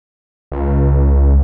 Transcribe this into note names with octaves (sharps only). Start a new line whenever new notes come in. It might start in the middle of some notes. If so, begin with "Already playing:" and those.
C#2